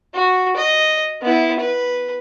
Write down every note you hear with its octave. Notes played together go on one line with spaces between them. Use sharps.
F#4
D#5
B3 E4
B4